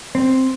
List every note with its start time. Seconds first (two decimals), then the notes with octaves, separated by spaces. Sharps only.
0.15 C4